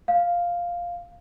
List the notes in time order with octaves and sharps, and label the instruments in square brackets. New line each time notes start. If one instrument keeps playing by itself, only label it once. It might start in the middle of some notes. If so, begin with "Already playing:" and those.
[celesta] F5